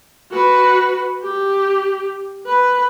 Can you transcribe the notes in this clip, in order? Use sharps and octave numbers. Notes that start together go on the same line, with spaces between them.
F#4 B4
G4
B4